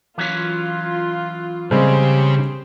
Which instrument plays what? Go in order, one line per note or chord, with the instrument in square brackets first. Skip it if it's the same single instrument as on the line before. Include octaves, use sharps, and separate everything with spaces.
[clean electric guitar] E3 F#3 C#4 [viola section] F4
[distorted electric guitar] C#3 [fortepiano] G3 G#3 C4 [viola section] G4 C5